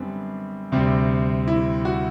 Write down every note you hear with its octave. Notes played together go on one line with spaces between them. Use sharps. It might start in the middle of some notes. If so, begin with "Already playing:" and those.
Already playing: F#2 D3 G3 B3 C4
D2 C3 G3 C4
E4
F#4